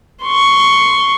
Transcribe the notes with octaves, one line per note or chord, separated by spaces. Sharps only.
C6 C#6